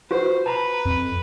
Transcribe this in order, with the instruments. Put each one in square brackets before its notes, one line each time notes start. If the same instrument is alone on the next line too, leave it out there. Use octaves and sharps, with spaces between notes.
[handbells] F4 F#4 B4 [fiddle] C5
[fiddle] B4 [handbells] A5 A#5
[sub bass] F2